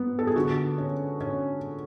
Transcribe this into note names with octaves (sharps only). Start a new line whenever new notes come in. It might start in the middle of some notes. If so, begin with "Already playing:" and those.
Already playing: G#2 B3
A4
G#4
D3 F#4
C#4
C#4